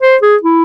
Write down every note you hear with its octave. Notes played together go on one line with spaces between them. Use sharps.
C5
G#4
E4